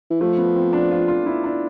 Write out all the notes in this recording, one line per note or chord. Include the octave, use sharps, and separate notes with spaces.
E3
F3 A3
B3
C4
D4
F4
F4
E4
D4